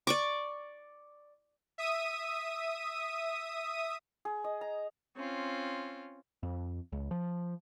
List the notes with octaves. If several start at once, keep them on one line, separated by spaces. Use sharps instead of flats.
D5 C#6 D6
E5 D#6 D#7
G#4
D#5
A#5
C4 C#4 F4
F2
C#2
F3